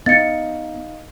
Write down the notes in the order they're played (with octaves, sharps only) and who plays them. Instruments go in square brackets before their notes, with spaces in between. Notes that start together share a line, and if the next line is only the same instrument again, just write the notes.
[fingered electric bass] B3 [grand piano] D#4 D#5 F5 [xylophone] A6 C#7